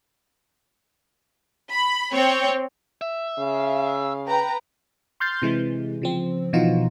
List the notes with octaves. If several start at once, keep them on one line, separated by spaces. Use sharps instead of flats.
B5
C4 C#5 G5
E5
C#3 F5
B4 G5 A#5
C6 F6 G6 A6 C7
C3 E3 G#3
C#3 F3 C4
B2 E3 F3 D#4 F4 F#4